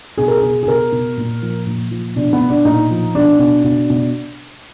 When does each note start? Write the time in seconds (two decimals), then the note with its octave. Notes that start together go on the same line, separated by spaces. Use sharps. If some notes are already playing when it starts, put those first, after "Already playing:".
0.18 B2 G#4
0.28 A#4
0.37 G#4
0.43 B2
0.63 G#4
0.67 B2 A#4
0.92 B2
1.17 A#2
1.42 F3
1.67 A#2
1.91 F3
2.16 B2 D4
2.33 B3
2.41 B2
2.50 D4
2.65 A#2 D#4
2.91 F3
3.15 B2 D4
3.39 B2
3.64 B2
3.90 B2